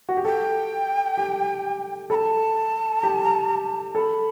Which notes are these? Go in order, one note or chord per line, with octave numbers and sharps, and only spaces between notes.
F#4
G4
A4 G5
G4
A4 A5 B5
G4
A4 B5